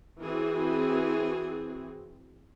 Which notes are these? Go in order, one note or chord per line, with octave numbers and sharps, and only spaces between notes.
E3 C4 F#4 G#4